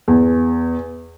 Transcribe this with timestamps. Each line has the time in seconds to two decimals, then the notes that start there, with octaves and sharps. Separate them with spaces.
0.08 E2